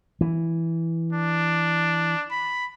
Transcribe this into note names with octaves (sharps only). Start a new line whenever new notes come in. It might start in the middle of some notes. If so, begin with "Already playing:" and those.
E3
D4
B5